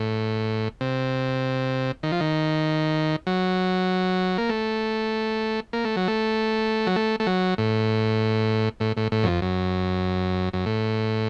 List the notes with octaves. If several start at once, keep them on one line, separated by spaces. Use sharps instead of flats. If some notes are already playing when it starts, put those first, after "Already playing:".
Already playing: A2
C3
D#3
F3
D#3
F#3
A#3
A3
A#3
A3
F#3
A3
F#3
A3
A3
F#3
A2
A2
A2
A2
F#2
F2
F#2
F#2
A2